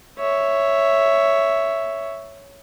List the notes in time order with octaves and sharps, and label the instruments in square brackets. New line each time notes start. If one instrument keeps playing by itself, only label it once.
[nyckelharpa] C#5 E5